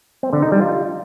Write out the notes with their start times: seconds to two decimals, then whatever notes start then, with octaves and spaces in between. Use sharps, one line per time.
0.23 C4
0.33 D3
0.42 D#4
0.52 G3
0.61 F4